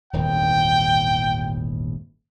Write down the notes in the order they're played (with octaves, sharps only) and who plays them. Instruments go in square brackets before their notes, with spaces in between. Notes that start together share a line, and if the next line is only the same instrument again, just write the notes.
[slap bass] D#1 G#1 E2 [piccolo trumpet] G5